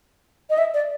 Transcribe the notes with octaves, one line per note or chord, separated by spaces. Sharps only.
D#5
E5
D5